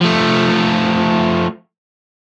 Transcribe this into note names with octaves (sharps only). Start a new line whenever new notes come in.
F3 A3